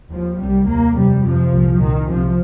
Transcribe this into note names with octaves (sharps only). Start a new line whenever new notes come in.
D#2 F3
C2 C3 G3
D#2 A#3
F2 C3 G3
F2 C3 F3
C2 A#2
C2 A#2 D#3
C2 C3 F3